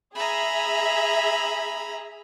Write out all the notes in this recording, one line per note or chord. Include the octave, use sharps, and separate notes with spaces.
G#4 E5 A#5 B5